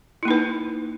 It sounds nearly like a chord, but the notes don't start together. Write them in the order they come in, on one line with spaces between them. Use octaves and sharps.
E4 A#3 D#4 B4